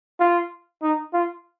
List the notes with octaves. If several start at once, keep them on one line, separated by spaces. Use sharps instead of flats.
F4
D#4
F4